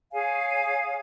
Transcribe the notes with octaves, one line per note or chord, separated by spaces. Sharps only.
G#4 C#5 F5 G#5